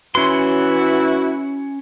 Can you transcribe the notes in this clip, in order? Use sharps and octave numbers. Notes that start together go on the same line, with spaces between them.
E3 C#4 E4 F#4 C6